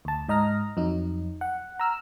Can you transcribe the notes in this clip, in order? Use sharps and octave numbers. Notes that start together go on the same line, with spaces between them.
D2 A5
G#2 D#5 A#5 F6 A#6
F2 F#3 D#4
F#5
A#5 E6 F6